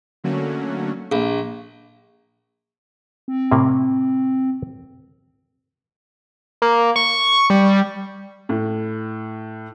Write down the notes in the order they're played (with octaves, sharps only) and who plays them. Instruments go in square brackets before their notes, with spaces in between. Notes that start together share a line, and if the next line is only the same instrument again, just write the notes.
[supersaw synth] D3 F#3 A3 A#3 C#4 F#4
[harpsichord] A#1
[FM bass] C4
[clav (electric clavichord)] A2 C3 A#3
[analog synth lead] A#3
C#6
G3
[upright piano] A2